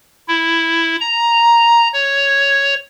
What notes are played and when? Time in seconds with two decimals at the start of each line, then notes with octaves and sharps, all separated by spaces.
0.28 E4
1.00 A#5
1.93 C#5